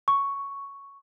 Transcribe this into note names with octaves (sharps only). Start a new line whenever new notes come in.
C#6